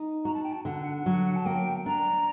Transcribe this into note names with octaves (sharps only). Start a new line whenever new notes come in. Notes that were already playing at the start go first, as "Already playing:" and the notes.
Already playing: D#4
F#4 A#5
A5
G5
A5
D3 F#5
F#3 F#5
A5
A#3 G5
D4 A#5